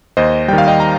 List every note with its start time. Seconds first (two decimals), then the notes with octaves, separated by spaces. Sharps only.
0.17 D#2 C5 D#5
0.48 D#3 G3 G5
0.58 F5
0.68 D#5 G5
0.80 G5 A#5